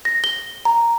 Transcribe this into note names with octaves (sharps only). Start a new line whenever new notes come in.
A#6
G7
A#5